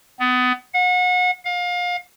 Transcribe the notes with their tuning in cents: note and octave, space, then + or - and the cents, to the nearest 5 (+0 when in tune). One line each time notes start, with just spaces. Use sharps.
B3 +25
F#5 -35
F5 +30